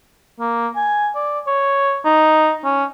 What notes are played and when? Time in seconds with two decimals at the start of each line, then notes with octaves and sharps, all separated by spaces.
0.39 A#3
0.75 G#5
1.15 D5
1.47 C#5
2.05 D#4
2.64 C#4